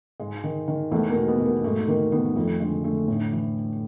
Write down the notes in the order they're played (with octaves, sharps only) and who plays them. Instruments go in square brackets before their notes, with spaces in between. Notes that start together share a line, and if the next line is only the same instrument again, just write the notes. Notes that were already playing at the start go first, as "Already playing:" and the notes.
[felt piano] G#2 G#3
D#3
D#3
E2 A3
A#3
B2
B3
B2
A#3
G#2 A3
D#3 A#3
D#3 B3
F2 A3
D3 G#3
D3 A3
A2
E3